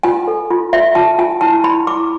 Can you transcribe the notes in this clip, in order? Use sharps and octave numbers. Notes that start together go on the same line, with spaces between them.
F4 G#5
A4
F4
F4 E5
F4 A5
F4 G#5
E4 A5
E4 B5
E4 D6